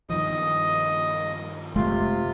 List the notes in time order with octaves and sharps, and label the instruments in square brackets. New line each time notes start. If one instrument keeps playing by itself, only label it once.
[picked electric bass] G2 D#3 F3 [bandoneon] D#5 D#6
[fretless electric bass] F#1 G#3 A3 [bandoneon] C3 F4